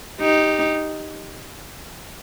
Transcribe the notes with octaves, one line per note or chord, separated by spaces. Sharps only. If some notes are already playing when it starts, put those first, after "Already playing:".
D#4 G4